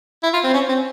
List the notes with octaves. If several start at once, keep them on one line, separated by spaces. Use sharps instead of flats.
E4
F4
C4
C#4
C4